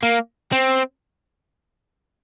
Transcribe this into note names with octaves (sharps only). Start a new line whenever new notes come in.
A#3
C4